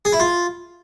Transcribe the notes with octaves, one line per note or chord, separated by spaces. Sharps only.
G#4
E4
F4